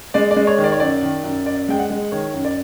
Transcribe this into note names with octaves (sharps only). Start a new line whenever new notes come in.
G#3 D5
D5
G#3
C#5
D#3
D5
C#5
F#2 D5
D#3
F#2
F#2 D5
G#3 G5
F#5
G#3
D#3 C#5
F#2
D5